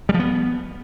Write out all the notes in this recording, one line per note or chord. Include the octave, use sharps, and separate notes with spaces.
G3
F3
B3